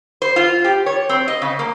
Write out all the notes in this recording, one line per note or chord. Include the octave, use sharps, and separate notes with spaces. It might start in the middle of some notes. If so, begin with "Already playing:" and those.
C5
F4
G4
C#5
C4
D#5
C#3
A#3